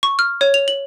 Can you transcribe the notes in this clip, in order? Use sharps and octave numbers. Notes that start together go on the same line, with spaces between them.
C#6
F6
C#5
F7
F#7